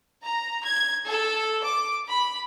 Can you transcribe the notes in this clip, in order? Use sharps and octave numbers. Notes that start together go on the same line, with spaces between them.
A#5
G#6
A4
D6
B5